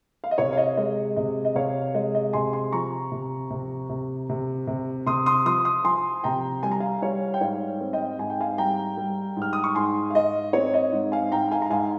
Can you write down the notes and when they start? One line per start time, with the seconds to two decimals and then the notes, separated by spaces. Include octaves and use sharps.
0.24 F5
0.31 D#5
0.38 C3 C#5
0.53 F5
0.57 D#5
0.77 G#3 D#5
1.16 C3 D#5
1.45 D#5
1.55 C3 C#5 F5
1.94 G#3 D#5
2.15 D#5
2.33 C3 G#5 C6
2.53 G#5 C6
2.73 F3 A#5 C#6
3.12 C3
3.50 C3
3.89 C3
4.30 C3
4.67 C3
5.06 C3 C6 D#6
5.26 C6 D#6
5.45 F3 C6 D#6
5.65 C6 D#6
5.85 F3 G#5 C6
6.24 C3 G5 A#5
6.63 G3 G#5
6.71 A#5
6.80 F5 G#5
7.02 G3 C#5 F5
7.34 G5
7.41 G#2 C#5 F5
7.80 C4
7.93 D#5 G5
8.19 G#2 G#5
8.30 G5
8.40 F5 G#5
8.58 G3 G5 A#5
8.97 G3
9.36 G#2
9.42 F6
9.53 D#6
9.64 C#6
9.75 G#2 G#5 C6
10.10 F5
10.14 G#2 D#5
10.53 C4 C#5
10.74 D#5
10.92 G#2
11.12 F5 G#5
11.32 G#2 G5 A#5
11.51 F5 G#5
11.62 A#5
11.70 G#2 F5 G#5